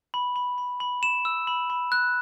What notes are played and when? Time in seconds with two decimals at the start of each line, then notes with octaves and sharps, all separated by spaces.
0.14 B5
0.36 B5
0.58 B5
0.80 B5
1.02 B5 E7
1.25 E6
1.47 B5
1.70 B5
1.92 F#6